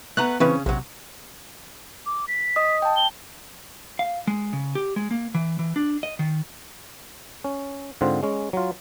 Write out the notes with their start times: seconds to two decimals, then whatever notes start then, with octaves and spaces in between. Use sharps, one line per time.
0.17 A3 B3 A#5 F#6
0.40 C#3 E3 C4 C#4 B4
0.66 A#1 C3 F#3
2.06 D6
2.28 B6
2.56 D#5 D#6
2.82 G5 A5
2.97 G7
3.99 F5
4.27 G#3
4.53 C#3
4.75 G4
4.96 G#3
5.11 A#3
5.34 E3
5.59 E3
5.76 D4
6.03 D#5
6.19 D#3
7.44 C#4
8.01 G#2 D3 C4 F4
8.23 G#3 C#4
8.53 F#3 F4